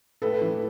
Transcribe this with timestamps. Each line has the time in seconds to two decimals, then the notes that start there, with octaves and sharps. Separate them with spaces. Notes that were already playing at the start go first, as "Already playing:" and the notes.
0.22 A2 A4 B4
0.41 E3